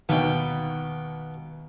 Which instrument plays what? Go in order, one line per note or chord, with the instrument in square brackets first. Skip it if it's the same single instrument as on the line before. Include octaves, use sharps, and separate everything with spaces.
[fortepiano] D#2 B2 D#3 [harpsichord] B3 G5